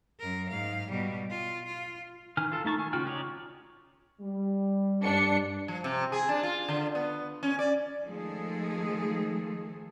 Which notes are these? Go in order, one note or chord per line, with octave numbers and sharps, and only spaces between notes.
F#2 A#4
G#2 F5
B2 G3
F4
F4
D#3 E3 G#5 F6
F4 A4
A3 D#4 A5 C#6
D#3 G#5
C#3 F4 F#4 G5 F6
C#4 D#4 F#4 C#5 D5
G3
G2 D4 C#7
F3
C3
G#4
D4
F4
D3
B3
C#4
D5
D#3 F3 G#3 A3 G#4 A4